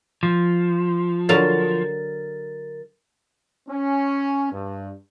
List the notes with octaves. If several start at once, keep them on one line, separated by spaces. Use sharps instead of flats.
F3
D3 F#3 A#4 F5 A6
C#4
G2